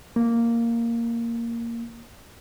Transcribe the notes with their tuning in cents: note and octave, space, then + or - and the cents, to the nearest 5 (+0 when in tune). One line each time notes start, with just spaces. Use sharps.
A#3 -5